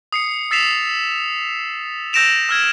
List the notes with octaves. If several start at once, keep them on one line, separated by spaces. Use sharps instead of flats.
D#6 C7 C#7
E6 A6 B6 C7 E7 F7
E6 G6 A#6 D7 E7 F7
E6 F6 G#6